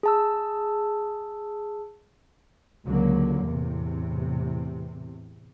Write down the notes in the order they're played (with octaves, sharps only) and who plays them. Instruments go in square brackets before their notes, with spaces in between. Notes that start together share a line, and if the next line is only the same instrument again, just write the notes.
[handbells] G#4 A5 E6
[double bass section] C#2 D3 F#3 A#3
E2 A2 C3